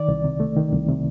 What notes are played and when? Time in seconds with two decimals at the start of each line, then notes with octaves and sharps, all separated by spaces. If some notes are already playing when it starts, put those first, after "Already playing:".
Already playing: D#3 D5
0.08 C2
0.24 C3
0.40 A3
0.57 D#3
0.72 C2
0.88 C3